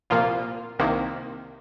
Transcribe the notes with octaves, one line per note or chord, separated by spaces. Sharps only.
C2 A#2 F3 A#3 F4
C2 C3 D#3 A#3